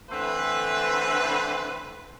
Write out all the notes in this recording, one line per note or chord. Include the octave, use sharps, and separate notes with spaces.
D3 E3 A3 C4 B4